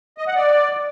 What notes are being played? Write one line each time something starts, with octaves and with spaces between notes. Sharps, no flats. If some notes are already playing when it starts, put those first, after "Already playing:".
D#5
F#5
D5